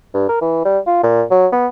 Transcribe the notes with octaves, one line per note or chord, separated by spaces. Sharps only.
G2
A#4
E3
G3
F4
A#2
F#3
B3